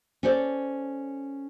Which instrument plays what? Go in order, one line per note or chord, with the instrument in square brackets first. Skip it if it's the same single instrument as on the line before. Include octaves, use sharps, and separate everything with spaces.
[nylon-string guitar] C#4 A4 C5 D5